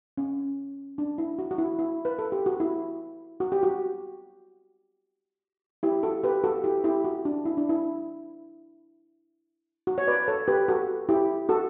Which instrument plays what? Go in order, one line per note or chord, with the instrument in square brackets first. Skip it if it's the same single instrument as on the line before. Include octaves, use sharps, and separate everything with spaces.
[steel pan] C#4
D4
E4
F#4
F#4
E4
E4
B4
A4
G4
F#4
E4
F#4
G4
F#4
E4 G4
F#4 A4
G4 B4
F#4 A4
E4 G4
E4 G4
F#4
D4
E4
D4
E4
F#4
C#5
B4 D5
A4 C#5
G4 B4
F#4 A4
E4 G4
F#4 A4